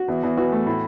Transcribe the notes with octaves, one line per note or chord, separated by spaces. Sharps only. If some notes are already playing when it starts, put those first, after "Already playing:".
Already playing: F#4
E2
E2
E3 F#4
A3
A2